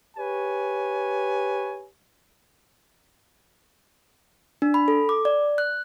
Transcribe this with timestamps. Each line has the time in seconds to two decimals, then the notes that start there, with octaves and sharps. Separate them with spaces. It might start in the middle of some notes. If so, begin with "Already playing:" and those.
0.16 G4 B4 C#5 G#5
4.62 D4
4.74 B5
4.88 A4
5.09 D6
5.25 D5
5.58 F#6